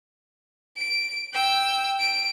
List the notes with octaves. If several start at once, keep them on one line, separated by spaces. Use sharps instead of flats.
D7
G5 E6
D7